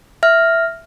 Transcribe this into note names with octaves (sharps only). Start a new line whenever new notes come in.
E5 F6